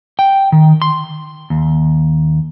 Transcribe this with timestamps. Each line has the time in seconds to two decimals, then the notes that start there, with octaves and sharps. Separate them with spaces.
0.19 G5
0.52 D#3
0.82 C6
1.50 D#2